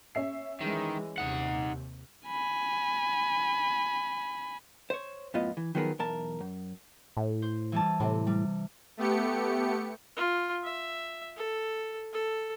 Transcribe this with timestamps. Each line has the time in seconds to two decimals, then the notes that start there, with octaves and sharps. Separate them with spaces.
0.15 C#4 E5 C7
0.61 D#3 E3 G#3
1.18 D#2 C3 D#4 F#5
2.27 G#5 B5
4.90 C5 C#5
5.34 F#2 A2 B3 F4 D#5
5.57 E3
5.75 D#3 F3 F#3 B3 G#4 A#4
5.99 B1 E2 A#4 A5
6.40 F#2
7.17 A2
7.42 C5
7.72 E3 G3 A5
8.00 A2 C3
8.27 G3
8.97 A3 B3 G4 C#7
10.16 F4
10.64 E5
11.37 A4
12.13 A4